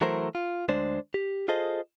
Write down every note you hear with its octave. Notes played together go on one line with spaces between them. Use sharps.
E3 F#3 A3 E4 A#4 C5
F4
D2 G#3 D4 C5 D5
G4
F4 G#4 A4 C5 D#5